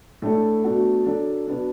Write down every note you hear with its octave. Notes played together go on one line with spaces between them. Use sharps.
A2 A3 D4 A4
B2 A3 D4 F#4 A4
F#3 D4 A4
B2 B3 D4